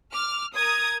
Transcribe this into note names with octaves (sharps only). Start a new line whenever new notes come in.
D6 F6
A#4 D#6 G#6